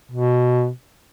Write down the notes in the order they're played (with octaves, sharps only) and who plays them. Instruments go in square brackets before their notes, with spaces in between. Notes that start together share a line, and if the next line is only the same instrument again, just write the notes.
[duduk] B2